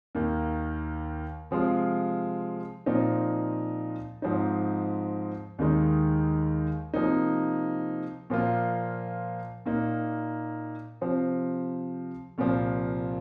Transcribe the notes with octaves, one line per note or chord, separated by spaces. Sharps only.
D#2 D#3 A#3
C3 F3 G#3 F4
A#2 F3 C4 D#4
G#2 F3 C4 D#4
D#2 D#3 G#3 D#4
C3 F3 A#3 D#4
A#2 F3 A#3 F4
A#2 A#3 D#4
C3 F3 C4
C2 A#2 F3